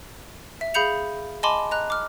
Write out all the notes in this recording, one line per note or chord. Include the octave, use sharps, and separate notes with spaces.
E5
G#4 F5 B5 G6 C#7 F7
D#5 G#5 A5 B5 C6 D6
D#5 A#5 F#6
D6 F6